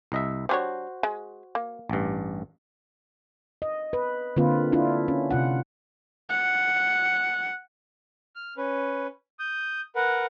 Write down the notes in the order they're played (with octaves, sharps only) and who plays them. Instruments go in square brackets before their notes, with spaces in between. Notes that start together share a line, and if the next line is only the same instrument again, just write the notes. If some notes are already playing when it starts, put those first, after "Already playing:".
[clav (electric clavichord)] C2 D#5 E5
[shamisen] G3 D4 C#5 [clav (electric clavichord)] F#4 C5
[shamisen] G#3
A#3
[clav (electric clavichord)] A1 G2
[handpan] D#5
B4
D3 A#3 C4 F4 B4
D4 E4 F4
C#4
C3 F4 F#5
[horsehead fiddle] F#5
[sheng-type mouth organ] F6
C#4 B4
D#6 G6
A#4 B4 F#5